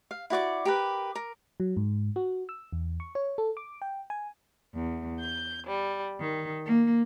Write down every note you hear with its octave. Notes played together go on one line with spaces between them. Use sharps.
F5
E4 F#4 D5 D6
G4 A#4 B4
A#4
F#3
G#2
F#4
E6
E2
C#6
C#5
A4
D6
G5
G#5
E2
G6
G3
D#3
A#3